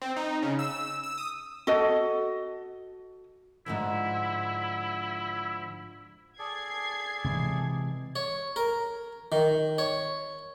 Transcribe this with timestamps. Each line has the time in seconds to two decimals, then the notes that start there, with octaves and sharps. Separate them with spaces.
0.02 C4
0.16 D#4
0.42 C#3
0.59 E6
1.04 E6
1.18 D#6
1.67 F#4 A4 D#5
3.66 G#2 D3 F3 E4
6.39 G#4 A4 D5 G#6 C7
7.24 C3 E3 G#3
8.16 C#5
8.56 A#4
9.32 D#3
9.78 C#5